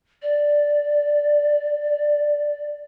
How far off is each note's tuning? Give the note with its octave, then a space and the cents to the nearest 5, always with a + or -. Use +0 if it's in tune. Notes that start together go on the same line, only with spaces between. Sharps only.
D5 +0